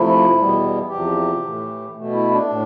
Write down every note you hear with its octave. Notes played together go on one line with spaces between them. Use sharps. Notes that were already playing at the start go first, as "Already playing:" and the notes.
Already playing: C3 F3 A3 E4
E2 B2 G3 B3
E2 C3 F3 G4
A2 E3 A3
B2 A3
E4
D4
A2